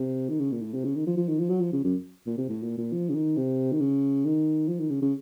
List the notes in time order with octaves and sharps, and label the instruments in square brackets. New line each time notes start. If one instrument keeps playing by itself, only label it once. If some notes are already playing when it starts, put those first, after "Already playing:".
Already playing: [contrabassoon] C3
D#3
C#3
A#2
A2
C3
C#3
D#3
F3
F3
D#3
F3
F#3
F3
C#3
F#2
A#2
C3
A2
A#2
A#2
F3
C#3
D#3
C3
D#3
C#3
D#3
F3
D#3
C#3
C#3